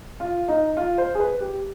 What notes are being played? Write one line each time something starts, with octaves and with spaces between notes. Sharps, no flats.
F4
D#4
F4
C5
G#4
B4
G4